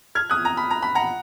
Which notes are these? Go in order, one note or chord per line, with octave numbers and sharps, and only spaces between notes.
F6 G#6
D#6 F#6
A#5
B5
A#5
B5
F#5 A#5